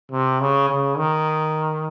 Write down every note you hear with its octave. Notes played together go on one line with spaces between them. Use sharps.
C3
C#3
C#3
D#3